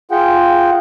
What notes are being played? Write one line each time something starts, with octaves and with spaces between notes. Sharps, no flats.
F4 G#4 F#5 G5